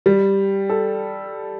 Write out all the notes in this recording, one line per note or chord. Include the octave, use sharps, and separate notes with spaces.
G3
A4